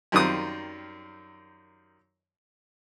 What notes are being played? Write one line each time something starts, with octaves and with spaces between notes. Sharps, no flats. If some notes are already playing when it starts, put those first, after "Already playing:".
F#2 D#3 G3 C4 F4 D#6